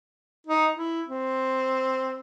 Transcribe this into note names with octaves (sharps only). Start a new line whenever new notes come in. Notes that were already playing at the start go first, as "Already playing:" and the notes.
D#4
E4
C4